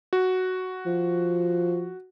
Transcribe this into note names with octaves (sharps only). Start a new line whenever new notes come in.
F#4
F3